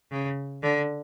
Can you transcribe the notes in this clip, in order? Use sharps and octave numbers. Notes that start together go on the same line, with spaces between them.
C#3
D3